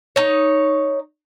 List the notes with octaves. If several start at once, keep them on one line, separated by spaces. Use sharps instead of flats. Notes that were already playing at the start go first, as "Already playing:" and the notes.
D#4 C#5